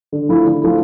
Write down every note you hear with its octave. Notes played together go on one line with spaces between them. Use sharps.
D3
F3 A3 E4
D3
F3 A3 E4